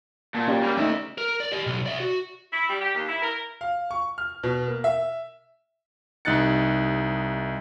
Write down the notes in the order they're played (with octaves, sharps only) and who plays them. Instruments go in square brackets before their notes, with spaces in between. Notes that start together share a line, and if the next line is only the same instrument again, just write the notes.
[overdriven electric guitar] A#2 [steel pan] A5
[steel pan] C#4 G4 D5
[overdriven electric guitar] G3 A#3 [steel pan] B5
[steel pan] A3 A#3 D#4 [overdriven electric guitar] D5 E5
[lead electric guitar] A#4
D5
G4 D#5
B1
D5 E5
F#4
[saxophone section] E4
G3
G4
D#2
E4
A#4
[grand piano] F5
C#6
F6
B2
A#3
E5
[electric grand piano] C2 D#4 F#6 A6 C#7